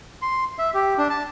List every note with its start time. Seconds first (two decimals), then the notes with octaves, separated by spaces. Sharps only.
0.22 C6
0.59 E5
0.74 G4
0.98 D4
1.10 A5